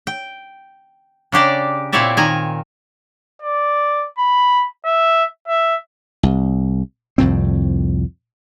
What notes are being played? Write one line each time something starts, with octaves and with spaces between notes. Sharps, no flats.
G5
C#3 D4 G4 D5 A#5
A#2 C4 E4 C#5 D5 E5
D#3 G#5 A#5
D5
B5
E5
E5
C2
C2 F2 A2 C4